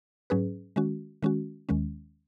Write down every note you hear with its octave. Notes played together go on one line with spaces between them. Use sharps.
G#2 F#3 C#4 G#4 B4
D#3 G#3 C#4 F#4
D#3 G#3 C#4 F#4
D#2 D#3 G#3 C#4